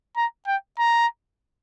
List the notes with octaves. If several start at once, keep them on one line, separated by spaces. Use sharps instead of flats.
A#5
G5
A#5